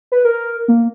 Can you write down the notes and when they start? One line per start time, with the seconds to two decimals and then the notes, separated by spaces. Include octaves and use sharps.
0.12 B4
0.25 A#4
0.68 A#3